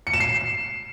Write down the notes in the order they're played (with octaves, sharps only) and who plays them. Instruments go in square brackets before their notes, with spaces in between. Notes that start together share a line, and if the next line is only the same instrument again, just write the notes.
[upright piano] C#7
E7
C7